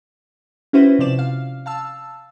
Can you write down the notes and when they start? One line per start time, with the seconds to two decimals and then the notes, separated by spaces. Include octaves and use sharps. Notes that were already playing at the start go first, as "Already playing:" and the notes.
0.73 C#4 E4 F#4 B4 C5
0.99 C3 F3 C5 D5 E7
1.19 F5
1.66 F5 A5 E6